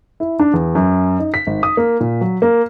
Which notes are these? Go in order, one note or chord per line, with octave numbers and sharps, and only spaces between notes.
E4
D4
E2
F#2
D#4
B6
G#1
D#6
A#3
A#2
F#3
A#3